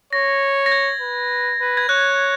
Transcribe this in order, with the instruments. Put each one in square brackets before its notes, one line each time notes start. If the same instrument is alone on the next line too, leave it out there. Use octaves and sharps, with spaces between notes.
[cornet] C#5 [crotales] A#6
[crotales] A#6
G#6
[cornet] B4
B4
[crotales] G#6
[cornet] C#5 [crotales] F#6